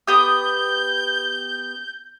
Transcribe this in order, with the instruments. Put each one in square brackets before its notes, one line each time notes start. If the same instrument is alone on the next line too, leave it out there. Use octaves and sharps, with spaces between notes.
[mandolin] B3 G4 D#6 [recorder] G6